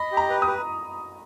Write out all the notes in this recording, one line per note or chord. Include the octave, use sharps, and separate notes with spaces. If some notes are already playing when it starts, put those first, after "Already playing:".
Already playing: D#5 B5
G4
A#5
B4
D#6
B4